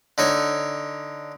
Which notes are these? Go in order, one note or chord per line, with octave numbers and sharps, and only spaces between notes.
D3 D#4 C#5